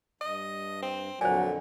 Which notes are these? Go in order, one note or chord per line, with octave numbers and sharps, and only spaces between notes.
G2 D#5
C4
F2 A#2 D3 F#3 C5 G#5